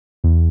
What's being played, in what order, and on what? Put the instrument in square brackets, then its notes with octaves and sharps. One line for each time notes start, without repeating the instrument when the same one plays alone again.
[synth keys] E2